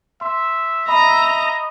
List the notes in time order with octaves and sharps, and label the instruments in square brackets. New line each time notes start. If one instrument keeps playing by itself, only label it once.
[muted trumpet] E5 [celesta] C6
[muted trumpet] D#5 [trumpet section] E5 [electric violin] A#5 [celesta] B5